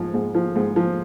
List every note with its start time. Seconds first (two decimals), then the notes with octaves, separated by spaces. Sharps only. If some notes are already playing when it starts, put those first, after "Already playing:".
Already playing: G#2 F3
0.14 G#2
0.35 F3
0.56 G#2
0.76 F3